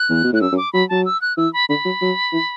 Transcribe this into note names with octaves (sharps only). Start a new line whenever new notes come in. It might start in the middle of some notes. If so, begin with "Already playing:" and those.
Already playing: F#6
E2
B2
A2 F#6
F#2 E6
F#2
D6
F#3 B5
F#3 A5
E6
F#6
E3 E6
B5
D3 B5
F#3
F#3
E3